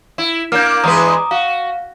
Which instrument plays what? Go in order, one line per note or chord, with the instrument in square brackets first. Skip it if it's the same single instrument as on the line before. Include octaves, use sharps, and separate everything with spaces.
[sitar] E4
[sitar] A#3 D4 [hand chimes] F6 G6
[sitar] E2 G#3 B4 [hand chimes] A#5 D6 D#6
[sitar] F#4 [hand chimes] F5